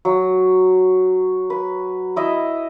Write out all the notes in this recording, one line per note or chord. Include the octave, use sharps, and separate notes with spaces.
F#3
B4
E4 D#5 E5